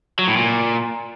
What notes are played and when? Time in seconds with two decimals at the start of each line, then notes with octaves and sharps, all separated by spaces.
0.19 F#3
0.28 A2
0.36 A#2